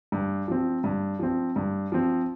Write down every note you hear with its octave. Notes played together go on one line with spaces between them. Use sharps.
G2
F3 C4
G2
F3 C4
G2
F3 C4